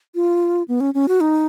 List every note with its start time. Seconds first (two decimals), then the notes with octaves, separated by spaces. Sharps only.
0.15 F4
0.68 B3
0.80 C#4
0.94 C#4
1.08 F#4
1.21 D#4